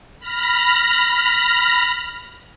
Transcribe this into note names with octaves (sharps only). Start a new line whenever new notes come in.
B5 F6 A#6